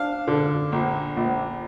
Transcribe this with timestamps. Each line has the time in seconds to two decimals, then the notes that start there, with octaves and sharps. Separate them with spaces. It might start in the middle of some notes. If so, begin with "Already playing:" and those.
Already playing: D4 F5
0.28 D3
0.72 A#1
1.17 A#1